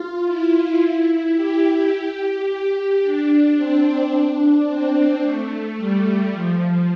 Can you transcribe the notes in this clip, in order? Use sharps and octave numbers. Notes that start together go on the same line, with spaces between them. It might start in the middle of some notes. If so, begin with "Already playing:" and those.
Already playing: F4
E4
G4
G4
D4
C4
D4
C4
A3
G3
F3